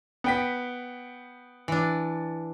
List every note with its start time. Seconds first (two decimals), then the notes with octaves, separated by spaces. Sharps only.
0.24 B3 G5 B6
1.68 E3 D4